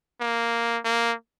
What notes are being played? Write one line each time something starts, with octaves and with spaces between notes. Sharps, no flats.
A#3
A#3